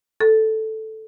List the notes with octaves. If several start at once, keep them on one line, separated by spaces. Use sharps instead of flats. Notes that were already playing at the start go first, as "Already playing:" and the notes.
A4